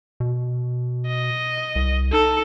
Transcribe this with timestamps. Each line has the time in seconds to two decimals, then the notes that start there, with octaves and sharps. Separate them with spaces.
0.20 B2
1.07 D#5
1.76 C2
2.13 D#4 A4